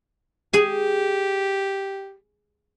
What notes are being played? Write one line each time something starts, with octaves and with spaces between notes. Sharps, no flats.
G4 G#4 G#5